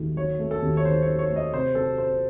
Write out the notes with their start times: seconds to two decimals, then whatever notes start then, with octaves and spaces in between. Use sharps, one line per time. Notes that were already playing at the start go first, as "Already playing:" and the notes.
Already playing: D#2 D#3 F#3 A3
0.16 F#3 C#5
0.39 A3
0.51 A4
0.62 D#2
0.77 C#5
0.85 D#3 C5
1.02 C#5
1.08 F#3
1.19 C#5
1.30 A3
1.36 D#5
1.53 C3 C5
1.75 F#3 A4
1.98 C4 C5